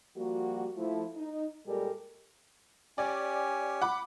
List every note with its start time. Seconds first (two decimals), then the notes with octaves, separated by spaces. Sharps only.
0.16 F3 G3 A#3 F#4
0.77 F3 A3 E4
1.16 D#4
1.67 A#2 G3 G#3 G4 A4 A#4
2.98 C#4 G4 D5 G#5
3.82 F#5 B5 D6